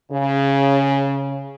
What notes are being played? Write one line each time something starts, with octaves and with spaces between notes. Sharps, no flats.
C#3